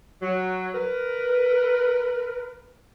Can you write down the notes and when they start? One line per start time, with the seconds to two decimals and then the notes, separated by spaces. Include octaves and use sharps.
0.21 F#3
0.73 A#4 B4